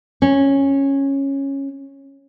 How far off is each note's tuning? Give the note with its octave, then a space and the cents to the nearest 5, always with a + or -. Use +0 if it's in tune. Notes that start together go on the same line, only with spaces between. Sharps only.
C#4 -10